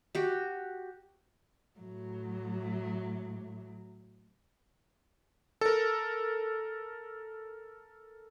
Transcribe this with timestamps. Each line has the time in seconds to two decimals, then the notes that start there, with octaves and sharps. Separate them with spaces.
0.15 F#4 G4
1.79 A2 F#3
5.61 A4 A#4